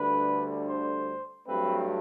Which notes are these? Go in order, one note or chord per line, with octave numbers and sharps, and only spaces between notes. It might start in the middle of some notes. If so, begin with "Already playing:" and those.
Already playing: D2 D3 G3 B4
C5
G2 F#3 A3 C4 B4